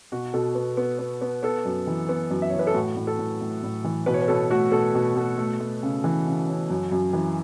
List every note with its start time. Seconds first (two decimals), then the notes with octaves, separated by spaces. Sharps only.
0.12 B2 F#4
0.34 B2 A4
0.55 B3
0.77 B3
0.99 B3
1.21 B3
1.43 B3 A4
1.65 F#2
1.87 E3
2.09 B3
2.30 F#2
2.42 E5
2.50 C#5
2.53 E3
2.59 B4
2.67 A4
2.74 A2 F#4
2.97 A2
3.07 A4
3.19 A2
3.41 A2
3.63 A2
3.84 E3
4.06 B2 B4
4.14 C#5
4.21 B4
4.28 B2 A4
4.50 A3 F#4
4.72 B2 A4
4.95 B2
5.16 B2
5.38 A3
5.60 A3
5.83 C#3
6.04 E3
6.26 C#3
6.49 C#4
6.70 F#2
6.92 F#2
7.13 E3